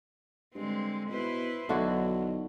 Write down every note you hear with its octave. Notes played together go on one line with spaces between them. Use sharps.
G2 D3 G#3 C4
B2 E4 B4 C5
B1 D3 D#3 F#3 E4 F#4